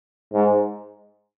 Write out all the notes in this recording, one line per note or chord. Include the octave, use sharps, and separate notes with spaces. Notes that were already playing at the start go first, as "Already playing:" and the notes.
G#2